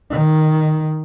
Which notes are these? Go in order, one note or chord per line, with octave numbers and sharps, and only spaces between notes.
D#3